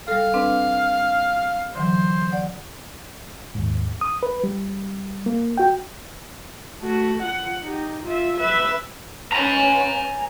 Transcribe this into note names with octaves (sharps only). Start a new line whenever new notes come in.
G3 A4 F5
C4 D4 B4
D3 E3 F#3 C5
D5 F#5
D#2 G#2
D#6
B4
G3
A#3
F#4 G5
A3 F#4
F4 F#5
D#4 G4
F4 E5
B4 E5
C#4 B4 G#5 A#5